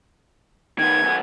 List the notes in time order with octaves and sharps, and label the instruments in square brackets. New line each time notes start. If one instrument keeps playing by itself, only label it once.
[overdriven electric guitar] D#3 B3 [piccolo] G#6
[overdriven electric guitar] F#2 B3